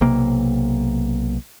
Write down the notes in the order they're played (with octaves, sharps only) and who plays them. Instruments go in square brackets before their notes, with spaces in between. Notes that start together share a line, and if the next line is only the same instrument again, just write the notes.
[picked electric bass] B1 C3 A#3